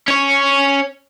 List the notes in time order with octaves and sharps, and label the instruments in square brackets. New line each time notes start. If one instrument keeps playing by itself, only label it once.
[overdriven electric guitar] C#4 C#5